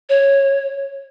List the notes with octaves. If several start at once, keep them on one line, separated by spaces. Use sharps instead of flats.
C#5